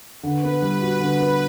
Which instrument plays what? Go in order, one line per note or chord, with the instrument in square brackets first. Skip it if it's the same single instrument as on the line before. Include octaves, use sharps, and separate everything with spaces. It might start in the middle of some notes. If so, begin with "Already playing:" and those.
[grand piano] D3 [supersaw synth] B4
[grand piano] B3
G3
F#4
[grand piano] D3 [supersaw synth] B4
[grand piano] B3